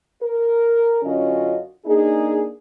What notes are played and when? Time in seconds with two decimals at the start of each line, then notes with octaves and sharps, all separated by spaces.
0.22 A#4
1.02 F#2 D3 C#4 F4 F#4 D#5
1.86 A#3 D4 D#4 G#4